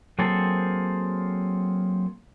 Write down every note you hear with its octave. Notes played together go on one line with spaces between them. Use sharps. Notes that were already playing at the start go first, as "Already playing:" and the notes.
F#3 A#3 C4 G#4 A4 C5